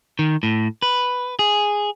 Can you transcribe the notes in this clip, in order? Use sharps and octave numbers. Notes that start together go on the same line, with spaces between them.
D#3
A2
B4
G#4